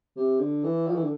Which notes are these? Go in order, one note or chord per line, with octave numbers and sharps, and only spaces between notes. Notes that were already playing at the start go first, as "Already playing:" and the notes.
C3
D3
E3
F3
E3
D3